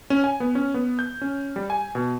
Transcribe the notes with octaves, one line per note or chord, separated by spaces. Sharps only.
C#4
G#5
B3
C#4
B3
G6
C#4
G3
G#5
B2